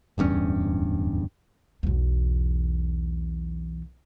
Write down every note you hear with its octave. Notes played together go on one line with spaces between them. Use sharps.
D1 E2 G2 C#4
B1 E2